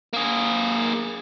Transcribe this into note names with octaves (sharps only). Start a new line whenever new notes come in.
A#3 G#4